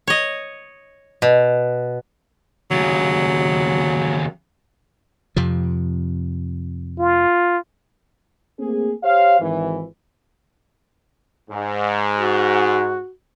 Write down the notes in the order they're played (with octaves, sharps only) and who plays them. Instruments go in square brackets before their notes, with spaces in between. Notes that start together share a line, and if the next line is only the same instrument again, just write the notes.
[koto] C#5 D#5
B2
[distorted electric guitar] D#2 C#3 [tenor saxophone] F#3
[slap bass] F2 C3 F3
[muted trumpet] F4
[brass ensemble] A3 A#3 C4 G#4
G4 C5 C#5 F5
G#1 E3
[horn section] G#2
[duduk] F#4